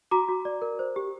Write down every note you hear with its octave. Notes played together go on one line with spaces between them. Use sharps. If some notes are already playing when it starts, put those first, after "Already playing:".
F#4 A#5 D6
F#4
D5
A#4
C5
G4